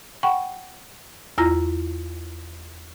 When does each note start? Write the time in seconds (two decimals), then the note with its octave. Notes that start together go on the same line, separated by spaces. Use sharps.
0.23 F#5 G5 B5 C#6
1.38 E2 E4 F4 A#5 A#6